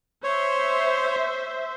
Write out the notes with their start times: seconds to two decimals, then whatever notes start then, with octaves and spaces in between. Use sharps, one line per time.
0.24 C5 C#5 E5